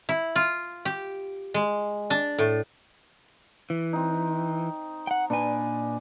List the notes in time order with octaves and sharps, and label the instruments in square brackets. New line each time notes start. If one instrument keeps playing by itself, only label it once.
[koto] E4
F4
G4
G#3
D4
A2
[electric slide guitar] E3
[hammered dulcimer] C4 D#4
[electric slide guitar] F#5 G5
[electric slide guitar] A#2 G#5 [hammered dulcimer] D4 B4